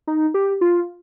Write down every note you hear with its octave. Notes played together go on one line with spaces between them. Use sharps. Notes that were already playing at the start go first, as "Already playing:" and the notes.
D#4
G4
F4